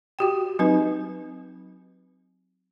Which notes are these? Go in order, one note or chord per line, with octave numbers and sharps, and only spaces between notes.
F#4 G4 G5
F#3 C4 D#4 B4